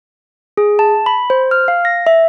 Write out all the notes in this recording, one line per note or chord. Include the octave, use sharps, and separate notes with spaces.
G#4
A5
B5
C5
F6
F5
A#6
E5